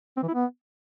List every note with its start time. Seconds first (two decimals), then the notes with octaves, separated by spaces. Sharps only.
0.17 C4
0.23 E3
0.28 E4
0.34 B3